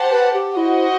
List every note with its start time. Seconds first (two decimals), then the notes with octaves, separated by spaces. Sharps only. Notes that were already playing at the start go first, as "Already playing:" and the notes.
Already playing: G4 C5 F#5 A5
0.11 B4
0.34 G4
0.56 E4 F#4 C5 D#5